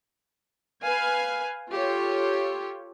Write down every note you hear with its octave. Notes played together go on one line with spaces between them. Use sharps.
B4 F5 G#5
F4 G4 A4 C#5